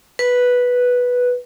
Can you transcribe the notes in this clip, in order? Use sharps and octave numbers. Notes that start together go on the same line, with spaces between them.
B4